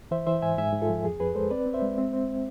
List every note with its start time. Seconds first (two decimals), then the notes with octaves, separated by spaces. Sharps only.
0.11 E3 C5 E5
0.27 E3 C5 E5
0.42 G#2 E5 G#5
0.58 G#2 E5 G#5
0.73 G#2
0.82 F4 A4
0.89 F3
1.05 F2 G#4
1.20 F2 G#4 B4
1.35 G#3 A4 C5
1.50 C4 B4 D5
1.66 C4
1.74 C5 E5
1.82 G#3
1.98 C4
2.13 C4